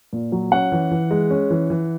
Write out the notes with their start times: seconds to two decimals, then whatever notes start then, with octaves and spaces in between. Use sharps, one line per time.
0.13 A#2
0.32 F#3
0.52 C#4 F#5
0.72 E3
0.91 E3
1.11 G#3
1.30 C#4
1.50 E3
1.70 E3